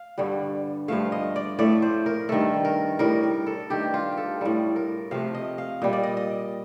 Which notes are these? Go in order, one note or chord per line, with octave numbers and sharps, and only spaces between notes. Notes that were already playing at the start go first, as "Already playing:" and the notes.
Already playing: F5
G2 D3 G3
G2 F3 A3 F5
D#5
D5
A2 A3 D5
C5
A#4
G2 D#3 A3 A4
A#4
A2 G3 A#4
A#4
A4
G2 D#3 A3 G4
F4
G4 A4
A2 G3 A4
A#4
C3 F3 A3 F5
D#5
F5
A#2 G3 D#5
D5
D#5
D#5